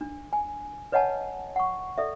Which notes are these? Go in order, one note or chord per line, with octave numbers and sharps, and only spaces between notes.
D4
G#5
B4 C#5 D#5 F#5 G#5 A5
F#5 C#6
A4 D5 E5